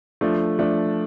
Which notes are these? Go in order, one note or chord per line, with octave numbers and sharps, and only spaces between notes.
F3 A3 D4
F3 A3 D4